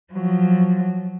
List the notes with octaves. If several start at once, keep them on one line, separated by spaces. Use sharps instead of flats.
F3 F#3